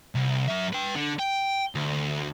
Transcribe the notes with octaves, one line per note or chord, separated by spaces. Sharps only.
C2
F#2 E5
B4 G5
D3
G5
D2